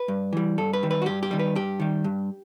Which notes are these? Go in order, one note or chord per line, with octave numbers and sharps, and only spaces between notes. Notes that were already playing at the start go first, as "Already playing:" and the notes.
Already playing: B4
G2
E3 G3
G2 A4
B4
D#3 G3
B4
F#4
G2 G4
G4
D#3 G3
B4
G2 G4
D#3 G3
G2